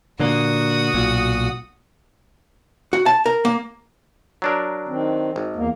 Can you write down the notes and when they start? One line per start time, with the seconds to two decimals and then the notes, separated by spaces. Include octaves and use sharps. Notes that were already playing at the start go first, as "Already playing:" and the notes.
0.19 A#2 D3 A#3 F#4 D#6
0.94 B1 A#2
2.93 F#4
3.06 A5
3.26 A#4
3.45 A#3
4.42 F#3 D4 A#4
4.88 D#3 C4
5.36 G#1
5.56 E2 A#3